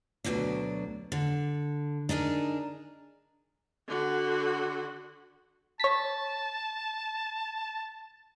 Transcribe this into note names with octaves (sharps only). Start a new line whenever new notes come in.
D2 G#2 B2 F#3 D4
D3
D4 D#4 G#4 A#4
D3 F#4
C#5 A5 B6